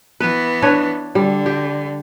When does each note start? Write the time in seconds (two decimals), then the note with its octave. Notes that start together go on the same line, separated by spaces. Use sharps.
0.20 E3 B3 B4
0.62 D4 B4 C#5
1.15 D3 G3
1.46 G4